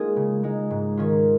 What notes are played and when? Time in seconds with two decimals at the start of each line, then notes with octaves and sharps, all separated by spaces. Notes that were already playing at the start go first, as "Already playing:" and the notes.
Already playing: G#3 A#3 D#4 F4 G#4
0.16 C#3
0.43 G#3 D#4
0.71 G#2
0.97 D#3 C#4 F4